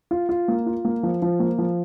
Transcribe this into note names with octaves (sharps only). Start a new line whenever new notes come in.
F4
F4
A#3
F4
A#3
F3
F3
A#3
F3